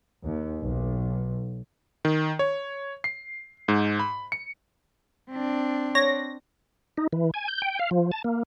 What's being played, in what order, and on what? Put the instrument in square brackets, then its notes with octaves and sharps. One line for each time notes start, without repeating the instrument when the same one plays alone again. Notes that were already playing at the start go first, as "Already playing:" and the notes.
[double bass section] D#2
B1
[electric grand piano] D#3
C#5
C7
G#2
B5
C#7
[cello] C4 D4
[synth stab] C#5 A#6
[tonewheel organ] D#4
E3
G#5
G6
G5
F5
F3
A5
A#3